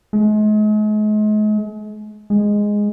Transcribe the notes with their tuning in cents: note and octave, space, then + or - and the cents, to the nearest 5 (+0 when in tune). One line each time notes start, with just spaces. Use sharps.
G#3 +40
G#3 -5